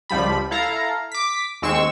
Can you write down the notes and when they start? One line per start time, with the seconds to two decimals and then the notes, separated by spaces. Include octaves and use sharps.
0.09 C#2 F3 G3 B5
0.51 E4 A4 F5 A#5
1.12 D6 B6
1.62 D#2 G#3 C4 C#6 E6 E7